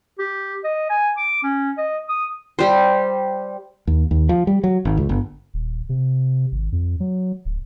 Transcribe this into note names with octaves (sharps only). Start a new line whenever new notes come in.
G4
D#5
G#5
D6
C#4
D#5
D#6
G3 C5
D#2
D#2
F3
G3
F#3
G#1
C#2
G1
D#1
C3
G#1
F2
F#3
D1